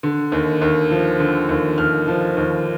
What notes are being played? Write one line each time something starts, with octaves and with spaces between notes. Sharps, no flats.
D3
D#2
D#2
F3
D3
D#2
D#2 F6
F3
D#2